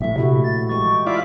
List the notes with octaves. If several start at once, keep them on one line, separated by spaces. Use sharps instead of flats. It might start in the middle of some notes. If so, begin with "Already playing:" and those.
A#1 A2 E5
C3 A3 E4 F#4
A6
E3 G#3 G4 C#6
E4 F4 D5 B6